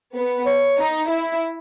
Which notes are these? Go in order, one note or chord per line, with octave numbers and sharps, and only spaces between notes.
B3
C#5
D#4
E4